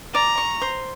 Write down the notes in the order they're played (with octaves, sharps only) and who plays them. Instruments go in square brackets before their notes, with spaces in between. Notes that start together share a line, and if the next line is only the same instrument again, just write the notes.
[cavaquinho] D5 [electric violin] A#5
[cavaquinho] C#6
C5